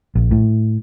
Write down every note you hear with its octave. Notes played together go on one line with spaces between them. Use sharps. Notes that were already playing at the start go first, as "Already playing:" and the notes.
A#1
A2